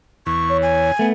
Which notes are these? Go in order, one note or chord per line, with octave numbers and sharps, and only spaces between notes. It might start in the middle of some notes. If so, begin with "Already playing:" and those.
E2 C#6
C#5
G#5
A3 B3